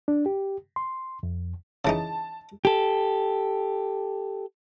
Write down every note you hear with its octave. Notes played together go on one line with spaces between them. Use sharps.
D4
G4
C6
F2
C#3 E3 D#4 A5
G4 A4